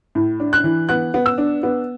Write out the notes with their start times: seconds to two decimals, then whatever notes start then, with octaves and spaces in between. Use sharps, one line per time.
0.15 A2
0.40 D4
0.53 F#6
0.64 E3
0.89 B3 F#6
1.14 B3
1.26 E6
1.38 D4
1.63 B3